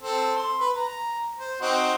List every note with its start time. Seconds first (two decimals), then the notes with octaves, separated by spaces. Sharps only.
0.02 C4 A4
0.37 C6
0.60 B4
0.76 A#5
1.39 C5
1.61 C4 D#4 F#4